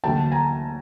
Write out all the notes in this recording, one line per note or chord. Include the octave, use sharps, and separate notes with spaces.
D2 D3 F#3 A#3 G5 A5
G#5 A#5